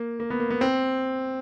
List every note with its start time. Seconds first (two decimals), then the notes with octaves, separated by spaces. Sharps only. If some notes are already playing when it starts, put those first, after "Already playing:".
Already playing: A#3
0.20 A#3
0.30 B3
0.40 A#3
0.50 B3
0.61 C4